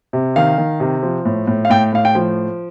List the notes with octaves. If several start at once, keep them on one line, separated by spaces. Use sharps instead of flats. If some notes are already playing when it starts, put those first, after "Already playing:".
C3
D#3 F5
D#3
C3
F3
A2
A2
F5
A2 G5
A2 F5
G5
F3